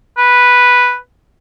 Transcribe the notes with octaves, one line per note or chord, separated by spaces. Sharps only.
B4